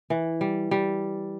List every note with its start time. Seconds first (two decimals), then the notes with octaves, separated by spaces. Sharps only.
0.10 E3
0.41 G3
0.71 G3